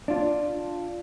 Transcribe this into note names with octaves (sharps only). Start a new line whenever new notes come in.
D4 F4